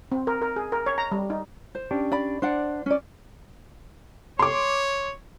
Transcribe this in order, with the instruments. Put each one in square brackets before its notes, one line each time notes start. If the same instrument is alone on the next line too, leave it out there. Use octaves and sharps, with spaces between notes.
[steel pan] C4
A#4
A#4
G#4
A#4
C#5
A#5
G3
D#4
[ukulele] C5
[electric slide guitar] C#4 D4 G4
[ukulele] D5 B5
[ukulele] D4 D5 F#5 [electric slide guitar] C5
[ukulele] C#4 D5
[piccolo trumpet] C#5 [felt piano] C6 D6